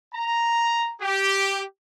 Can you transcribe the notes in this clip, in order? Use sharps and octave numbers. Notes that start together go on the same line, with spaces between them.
A#5
G4